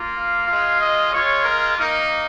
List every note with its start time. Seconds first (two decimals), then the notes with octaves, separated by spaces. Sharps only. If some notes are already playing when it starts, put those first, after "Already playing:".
Already playing: A#3 F4
0.15 F5
0.47 G#3 F4
0.80 D#5
1.11 G#3 F4 C#5
1.43 A#4
1.75 A#3 D#4 A#4